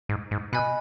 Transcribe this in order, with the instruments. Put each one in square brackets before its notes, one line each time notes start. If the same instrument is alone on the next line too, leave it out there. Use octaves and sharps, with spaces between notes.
[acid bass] G#2
G#2
[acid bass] B2 [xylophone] D#5 G#5 B5 F#6